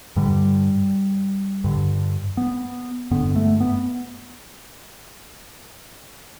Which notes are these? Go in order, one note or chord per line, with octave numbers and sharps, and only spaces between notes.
G2 D3 G3
G2 D3
B3
G2 D3 B3
A3
B3